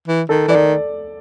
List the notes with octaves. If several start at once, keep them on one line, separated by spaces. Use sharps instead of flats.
E3
D#3 A4
E3 D5
D#3